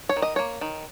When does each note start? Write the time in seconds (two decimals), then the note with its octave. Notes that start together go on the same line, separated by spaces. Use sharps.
0.09 C#5
0.16 D#3
0.22 D#5
0.36 A#3 C#5
0.61 D#3